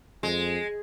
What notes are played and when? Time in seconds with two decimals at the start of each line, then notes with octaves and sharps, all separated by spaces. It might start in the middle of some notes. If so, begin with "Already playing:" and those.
0.23 F2 G#3